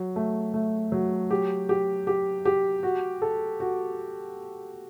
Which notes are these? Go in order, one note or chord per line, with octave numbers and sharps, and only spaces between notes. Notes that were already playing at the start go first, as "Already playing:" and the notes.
Already playing: F#3
A3
A3
F#3
G4
G4
G4
G4
F#4
A4
F#4